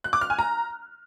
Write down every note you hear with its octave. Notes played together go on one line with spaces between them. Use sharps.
F#6
D6
F6
G#5
A#5